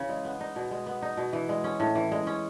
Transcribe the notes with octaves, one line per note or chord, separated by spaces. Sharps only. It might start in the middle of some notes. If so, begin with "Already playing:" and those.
Already playing: C#3 E3 C#4
G#3
B3
D#4
B2
G#3
B3
D#4
B2
E3
G#3
C#4
A2
E3
G#3
C#4